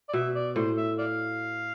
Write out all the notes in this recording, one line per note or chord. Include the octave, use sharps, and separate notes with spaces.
D5
B2 E5
D5
A2 C5
E5
D5 F5